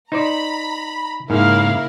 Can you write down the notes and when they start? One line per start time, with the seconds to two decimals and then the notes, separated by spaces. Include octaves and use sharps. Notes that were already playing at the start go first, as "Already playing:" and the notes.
0.12 D#4 C5 D5 A#5 B5
1.30 G#2 C#3 A#3 E4 A#4 F5